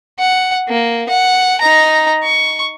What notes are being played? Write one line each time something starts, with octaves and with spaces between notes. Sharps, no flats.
F#5
A#3
F#5
D#4 A#5
C#6